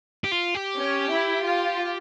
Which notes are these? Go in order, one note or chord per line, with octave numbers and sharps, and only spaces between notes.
G4
F4
G4
C#4
E4
F4